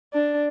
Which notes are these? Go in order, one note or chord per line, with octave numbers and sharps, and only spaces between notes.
D4